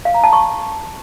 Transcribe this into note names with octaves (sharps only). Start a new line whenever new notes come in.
F5
A#5
A5
C#6